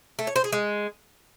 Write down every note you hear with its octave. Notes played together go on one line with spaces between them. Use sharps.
A3
C#5
C5
G#4
G#3